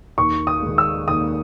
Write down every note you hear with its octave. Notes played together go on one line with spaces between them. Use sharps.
D#2 C#6
D#6
D#3 G#3
E6
D#2 D#6